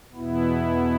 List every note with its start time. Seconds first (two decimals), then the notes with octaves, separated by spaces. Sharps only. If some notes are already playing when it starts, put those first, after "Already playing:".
0.12 E2 B2 B3 E4